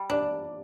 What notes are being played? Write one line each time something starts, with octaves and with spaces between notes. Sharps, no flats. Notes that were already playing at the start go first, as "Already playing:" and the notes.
Already playing: G3
D4 D5